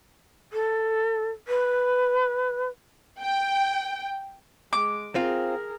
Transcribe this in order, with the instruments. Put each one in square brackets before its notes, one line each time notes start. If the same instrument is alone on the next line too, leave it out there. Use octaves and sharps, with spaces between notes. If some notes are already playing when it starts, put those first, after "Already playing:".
[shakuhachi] A4
B4
[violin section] G5
[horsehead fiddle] G#3 [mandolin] D6
[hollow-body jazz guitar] C4 F4 [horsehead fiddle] G#4 A#4